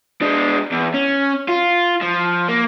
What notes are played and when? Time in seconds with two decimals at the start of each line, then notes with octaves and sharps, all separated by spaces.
0.22 G#3 D4
0.72 E2
0.94 C#4
1.48 F4
2.01 F3
2.48 A#3